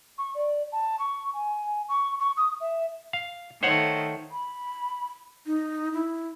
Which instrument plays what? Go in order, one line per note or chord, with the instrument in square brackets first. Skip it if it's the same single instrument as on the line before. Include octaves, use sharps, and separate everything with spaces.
[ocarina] C#6
D5
A5
C#6
G#5
C#6
C#6
D#6
E5
[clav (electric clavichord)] F5
[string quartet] D#3 A3 [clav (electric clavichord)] C5 C#5 F#5
[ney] B5
D#4
E4